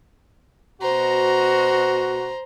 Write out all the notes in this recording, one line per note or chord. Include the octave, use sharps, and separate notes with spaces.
B2 F#4 C5 A#5